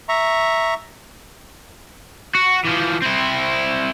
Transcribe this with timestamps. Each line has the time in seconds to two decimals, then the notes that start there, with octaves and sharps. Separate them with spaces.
0.09 E5 A#5 C#6
2.35 F#4
2.65 E3 F3
3.02 C4 E4